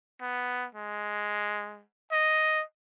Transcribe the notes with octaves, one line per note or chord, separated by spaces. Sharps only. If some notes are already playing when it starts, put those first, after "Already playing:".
B3
G#3
D#5